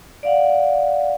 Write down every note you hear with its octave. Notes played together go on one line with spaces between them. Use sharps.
D5 F5 F#5